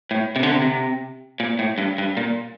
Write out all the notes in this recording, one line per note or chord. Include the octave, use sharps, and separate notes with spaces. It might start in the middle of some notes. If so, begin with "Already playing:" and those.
A2
C3
D3
C3
C3
A#2
A2
G2
G2
A#2